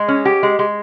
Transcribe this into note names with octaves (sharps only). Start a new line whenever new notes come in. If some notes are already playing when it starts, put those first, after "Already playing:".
Already playing: G#3
C#4
G4
G#3
G#3